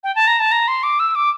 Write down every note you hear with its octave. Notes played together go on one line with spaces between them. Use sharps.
G5
A5
A#5
A5
A#5
C6
D6
E6
D6